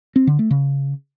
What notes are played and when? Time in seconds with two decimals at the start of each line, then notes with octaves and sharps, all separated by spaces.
0.16 C4
0.27 D3
0.39 A3
0.51 C#3